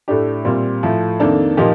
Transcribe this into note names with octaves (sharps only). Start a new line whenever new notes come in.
A2 A3 D4 G4
A#2 G3 C4
A2 F3 A3
F2 D#3 A#3 D4 A4
A#2 F3 A#3 D#4 G4